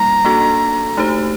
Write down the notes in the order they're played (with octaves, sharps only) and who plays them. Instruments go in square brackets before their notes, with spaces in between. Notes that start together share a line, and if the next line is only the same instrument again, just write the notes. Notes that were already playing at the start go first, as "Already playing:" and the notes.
Already playing: [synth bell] G3 A#3 D#4 [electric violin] A#5
[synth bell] A#3 D4 F#4 A4
A3 D#4 G4 C5